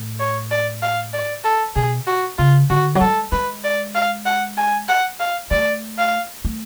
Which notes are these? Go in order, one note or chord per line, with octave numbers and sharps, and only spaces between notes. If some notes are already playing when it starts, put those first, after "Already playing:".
Already playing: A2
C#5
D5
F5
D5
A4
B2 G#4
F#4
C#3 F4
D3 F#4
F#3
G#3 A4
G#3 B4
D5
F5
F#5
G#5
F#5
F5
A3 D5
F5
A3